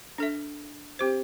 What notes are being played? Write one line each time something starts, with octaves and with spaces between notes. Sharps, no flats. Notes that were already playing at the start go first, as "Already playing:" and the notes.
D4 A4 E5
C4 G4 C5